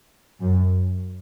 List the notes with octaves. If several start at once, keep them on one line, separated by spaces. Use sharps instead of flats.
F#2